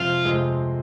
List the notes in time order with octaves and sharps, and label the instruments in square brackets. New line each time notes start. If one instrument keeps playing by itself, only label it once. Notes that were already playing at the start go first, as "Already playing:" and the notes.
Already playing: [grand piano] F2 C3 F3 G#3 C4 [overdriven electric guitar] F4
[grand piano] F2 C3 F3 G#3 C4